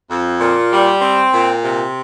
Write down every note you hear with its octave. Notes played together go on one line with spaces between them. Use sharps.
F2
A#2
G3
C4
A#2
C3